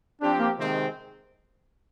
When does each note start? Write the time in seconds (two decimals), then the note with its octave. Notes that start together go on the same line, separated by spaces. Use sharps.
0.21 F3 C4 D4 G4
0.39 A#3
0.58 C3 D#3 G#3 C4